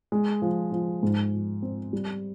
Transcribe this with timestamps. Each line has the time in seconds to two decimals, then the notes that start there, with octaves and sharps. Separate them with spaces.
0.12 G#3
0.42 F3
0.72 F3
1.03 G#2
1.33 F3
1.62 C4
1.93 G3